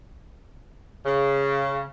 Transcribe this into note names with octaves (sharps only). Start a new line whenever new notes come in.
C#3